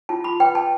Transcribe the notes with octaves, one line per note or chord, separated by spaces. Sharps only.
F4 A5
B5
B4 G5
A5